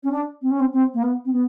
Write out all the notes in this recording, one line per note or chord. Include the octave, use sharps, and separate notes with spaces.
C#4
D4
C4
C#4
C4
C4
A#3
B3
C4
B3